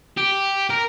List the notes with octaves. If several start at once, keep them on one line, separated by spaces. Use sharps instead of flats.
G4
A#4